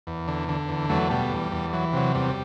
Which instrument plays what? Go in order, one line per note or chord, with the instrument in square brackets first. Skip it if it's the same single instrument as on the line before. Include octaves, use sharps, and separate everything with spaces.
[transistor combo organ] E2
D3
D3
E2
E2 F#3 A3
B2 G3
E2
E2
E3 F#3
C3 F#3
E2 G3